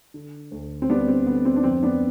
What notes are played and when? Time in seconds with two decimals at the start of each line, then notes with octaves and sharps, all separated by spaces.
0.14 D3
0.51 D2
0.82 C4
0.89 G3 B3 D4
1.08 C4
1.27 D3 B3
1.45 C4
1.56 D4
1.64 F2 C4
1.83 B3 D4